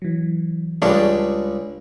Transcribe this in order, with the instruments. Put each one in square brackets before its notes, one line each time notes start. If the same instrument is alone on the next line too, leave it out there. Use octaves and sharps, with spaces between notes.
[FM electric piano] E3 F#3
[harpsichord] C#2 G3 G#3 [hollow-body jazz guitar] D4 G4 C#5